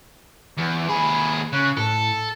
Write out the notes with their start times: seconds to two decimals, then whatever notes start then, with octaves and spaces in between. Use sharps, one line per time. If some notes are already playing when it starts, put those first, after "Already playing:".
0.58 E2
0.89 D#2 G#4 B5
1.52 C#3 F#6
1.77 A2 A4